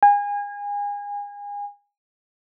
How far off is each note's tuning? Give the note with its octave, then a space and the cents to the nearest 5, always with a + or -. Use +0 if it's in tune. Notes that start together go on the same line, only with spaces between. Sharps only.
G#5 -30